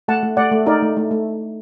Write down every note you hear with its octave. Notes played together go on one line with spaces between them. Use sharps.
A3 F#5 A5
A3
A3 D5 F#5
A3
D#4 A#4 D5
A3
A3
A3